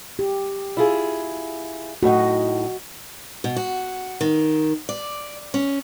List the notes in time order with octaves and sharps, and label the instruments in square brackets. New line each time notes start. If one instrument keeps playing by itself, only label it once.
[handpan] G4
[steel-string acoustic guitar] E4 F4 G#4
[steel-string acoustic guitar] A2 D#4 [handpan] F#4 D#5
[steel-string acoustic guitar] B2
F#4
D#3
D5
C#4